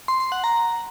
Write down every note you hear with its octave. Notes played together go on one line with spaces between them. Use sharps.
C6
C6
F#5
A#5